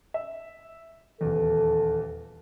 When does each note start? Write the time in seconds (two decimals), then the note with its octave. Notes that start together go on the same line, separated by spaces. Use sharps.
0.14 E5
1.21 D#1 E2 A4